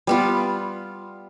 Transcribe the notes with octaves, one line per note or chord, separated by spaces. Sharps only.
G3 B3 F4